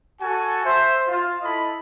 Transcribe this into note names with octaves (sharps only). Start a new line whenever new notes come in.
F#4 A4 G#5
C5 E5
F4
E4 A4 D#5 B5